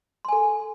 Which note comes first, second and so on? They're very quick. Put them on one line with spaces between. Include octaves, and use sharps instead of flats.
C6 G#5 A4